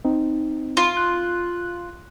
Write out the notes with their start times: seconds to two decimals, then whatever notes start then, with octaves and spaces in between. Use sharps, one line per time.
0.04 C4 D#4
0.77 F4
0.97 F#6